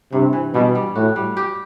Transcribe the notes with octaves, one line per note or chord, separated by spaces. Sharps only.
G2 C3
E3
B2 G3
G3
A2 F#4
G3
G4